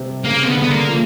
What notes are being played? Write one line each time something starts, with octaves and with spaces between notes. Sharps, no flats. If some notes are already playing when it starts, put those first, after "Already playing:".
Already playing: C3
C#3 A#3
C4
D3 B3
C#3
D3 B3
A#3
F3